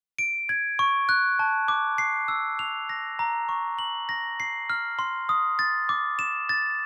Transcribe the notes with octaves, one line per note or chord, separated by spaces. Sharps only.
D7
G#6
C#6
F#6
A5
D6
C7
E6
F7
A#6
A#5
C#6
F#7
A#6
C7
F6
C6
D#6
A6
D6
E7
A6